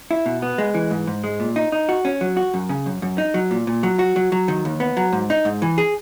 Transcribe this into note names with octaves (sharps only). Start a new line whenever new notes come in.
E4
B2
B3
G#3
E3
G#2
G#2
G#3
A#2
D#4
D#4
F#4
C#4
F#3
F#4
F#2
C#3
F#2
F#2
D#4
F#3
A#2
A#2
F#3
F#4
F#3
F#3
D#3
D#2
B3
F#3
G#2
D#4
G#2
E3
G#4